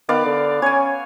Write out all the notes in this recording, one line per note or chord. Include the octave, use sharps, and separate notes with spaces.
D#3 B3 D5 F5
D3
C#4 C#5 G#5